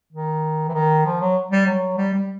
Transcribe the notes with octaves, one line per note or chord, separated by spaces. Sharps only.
D#3
E3
D#3
F3
F#3
G3
F#3
G3
G3